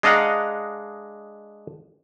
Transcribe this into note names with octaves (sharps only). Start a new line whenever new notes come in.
G#3 D4 D#5 F5 F#5 A#5